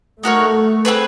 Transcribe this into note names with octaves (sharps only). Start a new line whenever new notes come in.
A3 D#4 F#4 A#4 C#5
C4 D#4 G#4 B4